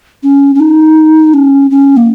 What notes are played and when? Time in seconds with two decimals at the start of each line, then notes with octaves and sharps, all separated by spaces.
0.23 C#4
0.55 C#4
0.60 D#4
1.34 C#4
1.71 C#4
1.97 A#3